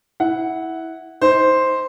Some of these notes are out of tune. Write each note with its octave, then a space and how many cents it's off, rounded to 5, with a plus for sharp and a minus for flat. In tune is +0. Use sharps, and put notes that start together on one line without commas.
E4 -15 F#5 +0
D#4 +35 C5 +0